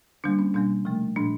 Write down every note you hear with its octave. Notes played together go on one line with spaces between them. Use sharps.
D3 G3 A#3 D4
C#4
B2 G3 A#3 D4
C3 F3 A3
A#2 F3 G#3 D4